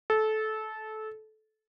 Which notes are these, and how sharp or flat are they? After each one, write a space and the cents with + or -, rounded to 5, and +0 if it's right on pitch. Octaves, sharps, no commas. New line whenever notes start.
A4 -20